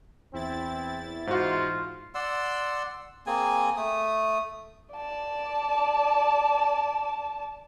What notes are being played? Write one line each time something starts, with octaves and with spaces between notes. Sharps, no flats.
E2 C4 E4 A6
G#2 F4 F#4 C5
D5 F#5 C6 E6
A#3 C4 G#4 G#5
A3 D#6
D5 A5